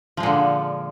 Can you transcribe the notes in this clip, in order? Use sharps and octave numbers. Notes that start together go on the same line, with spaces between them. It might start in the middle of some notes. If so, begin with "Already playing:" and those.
A#2 D3 F3 G#3